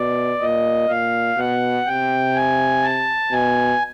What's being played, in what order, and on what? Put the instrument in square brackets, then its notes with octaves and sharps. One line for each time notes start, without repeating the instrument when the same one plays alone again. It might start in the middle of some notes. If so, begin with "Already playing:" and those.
Already playing: [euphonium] B2 [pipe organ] D5
[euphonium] A#2 [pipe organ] D#5
[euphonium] A#2 [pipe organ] F5
[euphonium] B2 [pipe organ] F#5
[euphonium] C3 [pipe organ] G5
[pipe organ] G#5
A5
[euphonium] B2 [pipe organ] G#5